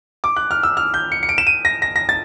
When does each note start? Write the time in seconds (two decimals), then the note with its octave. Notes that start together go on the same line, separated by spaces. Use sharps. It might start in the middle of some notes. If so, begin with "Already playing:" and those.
0.24 D6
0.36 F#6
0.51 F6
0.63 E6
0.77 F6
0.94 G6
1.12 C#7
1.23 C#7
1.29 D7
1.38 E7
1.47 D#7
1.65 A#6
1.82 A#6
1.96 A#6
2.09 A6